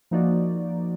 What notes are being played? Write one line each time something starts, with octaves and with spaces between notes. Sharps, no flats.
F3 A#3 D#4 F#4 D5